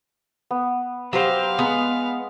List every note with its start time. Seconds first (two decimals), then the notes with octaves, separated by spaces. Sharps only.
0.51 B3
1.13 F#3 G4 C5 F5
1.59 G#3 B3